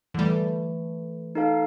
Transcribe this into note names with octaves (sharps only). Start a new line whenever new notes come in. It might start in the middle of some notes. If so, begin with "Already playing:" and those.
D3 E3 G3 A3
D#4 A4 F5